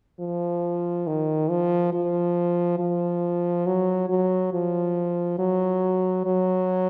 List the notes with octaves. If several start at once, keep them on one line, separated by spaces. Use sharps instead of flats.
F3
D#3
F3
F3
F3
F#3
F#3
F3
F#3
F#3